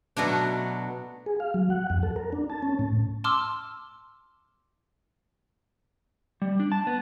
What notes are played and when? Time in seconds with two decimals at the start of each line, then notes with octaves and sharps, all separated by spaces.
0.17 B2 F#3 A3 D4
1.26 G#4
1.40 F5
1.54 F#3
1.70 F#5
1.90 F2
2.03 A4
2.16 A#4
2.33 D4
2.50 A5
2.62 C#4
2.79 A2
3.24 A5 C6 D6 E6 F6
6.42 G3
6.60 D4
6.72 A5
6.87 B3